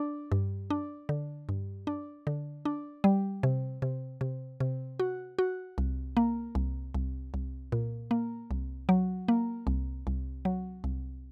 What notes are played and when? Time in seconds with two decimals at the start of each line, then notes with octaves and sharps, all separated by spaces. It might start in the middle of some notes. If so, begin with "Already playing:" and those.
Already playing: D4
0.32 G2
0.70 D4
1.09 D3
1.49 G2
1.87 D4
2.27 D3
2.65 D4
3.04 G3
3.43 C3
3.82 C3
4.21 C3
4.60 C3
5.00 F#4
5.39 F#4
5.78 C2
6.17 A#3
6.55 C2
6.94 C2
7.34 C2
7.72 A#2
8.11 A#3
8.51 C2
8.89 F#3
9.28 A#3
9.67 C2
10.07 C2
10.45 F#3
10.84 C2